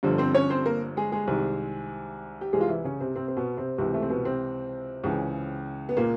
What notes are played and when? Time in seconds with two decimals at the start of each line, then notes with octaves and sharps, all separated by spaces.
0.03 G1 G2 D3 F3
0.18 C4 C5
0.35 C#4 C#5
0.50 C4 C5
0.66 A#3 A#4
0.97 G#3 G#4
1.12 G#3 G#4
1.28 C2 C3 D#3
2.41 G4
2.53 C2 C3 E3 G#3 G#4
2.61 F4
2.68 E3 E4
2.84 C#3 C#4
3.00 C3 C4
3.16 C3 C4
3.28 C4
3.37 B2 B3
3.58 C3 C4
3.78 C#2 C3 E3 C4
3.94 A3
4.02 C4
4.10 B2 B3
4.25 C3 C4
5.04 C#2 C#3 E3
5.89 B3
5.97 A#2 A#3